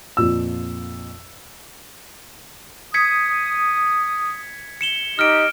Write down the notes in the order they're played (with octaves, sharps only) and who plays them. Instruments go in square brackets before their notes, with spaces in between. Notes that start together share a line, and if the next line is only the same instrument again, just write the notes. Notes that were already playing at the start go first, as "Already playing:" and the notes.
[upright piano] F2 A#2 E6
[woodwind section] D#6 [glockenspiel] G#6 B6 C#7
[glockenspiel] C#7 E7 G7
[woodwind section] D#4 G4 D#5 [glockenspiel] F6 D7